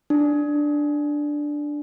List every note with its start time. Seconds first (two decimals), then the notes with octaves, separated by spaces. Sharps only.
0.10 D4